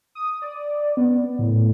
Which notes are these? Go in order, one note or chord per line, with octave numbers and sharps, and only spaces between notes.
D#6
D5
B3
A2